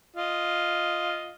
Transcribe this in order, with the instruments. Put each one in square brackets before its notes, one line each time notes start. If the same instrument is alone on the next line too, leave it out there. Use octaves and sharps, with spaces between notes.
[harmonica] F4 D#5